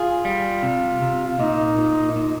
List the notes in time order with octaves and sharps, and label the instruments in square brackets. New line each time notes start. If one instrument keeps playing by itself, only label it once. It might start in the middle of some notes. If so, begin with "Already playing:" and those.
Already playing: [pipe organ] F4 [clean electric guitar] G#4
[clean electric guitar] G3
C3
C3
[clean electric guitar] A#2 [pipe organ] D#4
[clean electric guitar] A#2
A#2